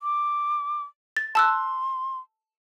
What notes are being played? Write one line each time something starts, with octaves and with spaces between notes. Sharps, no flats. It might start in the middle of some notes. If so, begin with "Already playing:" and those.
D6
A6
A5 C6 E6 F#6